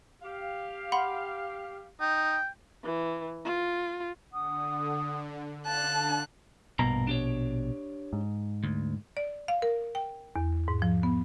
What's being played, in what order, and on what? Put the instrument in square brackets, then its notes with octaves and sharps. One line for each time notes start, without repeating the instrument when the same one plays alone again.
[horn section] G4 F5
[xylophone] F#5 B5 C6
[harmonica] D#4 [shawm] G5
[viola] E3
F4
[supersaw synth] D3 [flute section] F#5 D#6
[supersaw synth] D3 [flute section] F5 [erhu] A5 [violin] F#6
[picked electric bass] A#1 B2 [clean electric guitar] G2 A#3 A#5
[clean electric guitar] D4 G4 C#5
[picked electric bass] G#2
[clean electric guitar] D2
[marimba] D5
F5
A#4
G5
E2
G#2
F3
B3